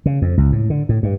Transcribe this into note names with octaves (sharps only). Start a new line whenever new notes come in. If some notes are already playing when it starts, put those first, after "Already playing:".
C#3
F2
C#2
A2
D3
A2
G2